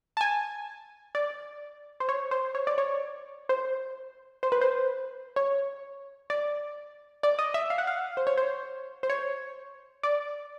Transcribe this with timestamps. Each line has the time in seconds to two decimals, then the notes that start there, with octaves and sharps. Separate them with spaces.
0.17 A5
0.21 G#5
1.15 D5
2.00 C5
2.09 C#5
2.31 C5
2.55 C#5
2.67 D5
2.78 C#5
3.49 C5
4.43 C5
4.52 B4
4.61 C5
5.36 C#5
6.30 D5
7.23 D5
7.39 D#5
7.54 E5
7.70 F5
7.78 F#5
7.87 F5
8.17 C5
8.27 C#5
8.37 C5
9.03 C5
9.10 C#5
10.03 D5